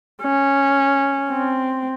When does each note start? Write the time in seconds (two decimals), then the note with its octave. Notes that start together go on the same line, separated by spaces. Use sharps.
0.23 C#4
1.31 C4